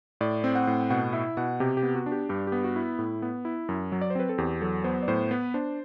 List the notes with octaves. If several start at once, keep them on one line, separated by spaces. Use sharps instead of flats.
A2 D5
C4
F#5
A2
B2 F#5
E4 E5
B2 F#5
C3 G4
G4
B3
F#4
D4
G4
G2 G4
G4
B3
F#4
E4
A2
B3
E4
F#2
F#3
D5
C5
C4 B4
A4
E2 G4
F#3 A4
B3 C5
D5
A2 C5
B3 B4
D4 C5